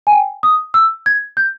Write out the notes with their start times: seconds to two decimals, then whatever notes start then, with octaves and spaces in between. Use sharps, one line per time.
0.07 G#5
0.12 G5
0.43 D#6
0.74 E6
1.06 G#6
1.37 G6